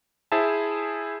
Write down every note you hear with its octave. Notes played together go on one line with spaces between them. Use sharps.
E4 G#4 C5 E5 A5